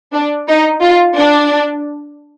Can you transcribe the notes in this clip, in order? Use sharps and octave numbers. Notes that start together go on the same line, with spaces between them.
D4
D#4
F4
D4